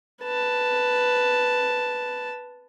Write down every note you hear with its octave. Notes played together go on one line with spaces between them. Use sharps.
B4 A5